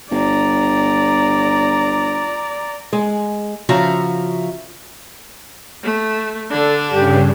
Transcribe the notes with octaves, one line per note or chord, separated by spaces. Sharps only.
G1 D5 A#5
G#3
C#3 F3 F#4 E5 F5 A#5
A3
D3 D4 A4
G2 C#3 G4